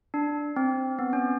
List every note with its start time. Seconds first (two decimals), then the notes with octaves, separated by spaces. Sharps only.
0.14 D4
0.56 C4
0.99 B3
1.13 C#4